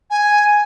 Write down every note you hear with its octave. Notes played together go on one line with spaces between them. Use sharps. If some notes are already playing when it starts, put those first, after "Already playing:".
G#5